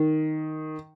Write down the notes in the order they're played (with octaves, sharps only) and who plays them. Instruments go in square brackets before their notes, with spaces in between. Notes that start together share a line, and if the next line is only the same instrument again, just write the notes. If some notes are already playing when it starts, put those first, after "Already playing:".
Already playing: [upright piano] D#3